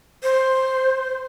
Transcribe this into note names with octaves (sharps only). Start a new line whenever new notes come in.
C5